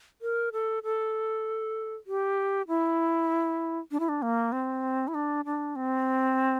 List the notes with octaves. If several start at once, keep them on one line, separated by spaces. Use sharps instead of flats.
A#4
A4
A4
G4
E4
D4
E4
D4
A#3
C4
E4
D4
D4
C4